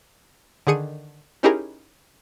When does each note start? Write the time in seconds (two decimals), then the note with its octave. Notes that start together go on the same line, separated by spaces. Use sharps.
0.67 D3 D#3 G#4 C#7 D#7
1.43 C#4 D#4 E4 G4 G#4 A#4